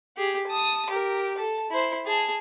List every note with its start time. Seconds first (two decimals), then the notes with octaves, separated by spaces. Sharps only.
0.17 G4 G#4
0.47 A5 D#6
0.90 G4 A#4
1.38 A4 A5
1.70 E4 C5
2.06 G#4 A5